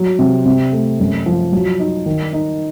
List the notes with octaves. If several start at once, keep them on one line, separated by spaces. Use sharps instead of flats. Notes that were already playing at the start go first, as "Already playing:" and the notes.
Already playing: F#3
C3
C3
A3
F#2
F3
F#3
D#4
D#3
D#4